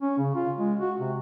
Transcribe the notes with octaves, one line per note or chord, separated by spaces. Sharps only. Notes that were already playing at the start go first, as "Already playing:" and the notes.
C#4
C#3
F4
G#3
F#4
C3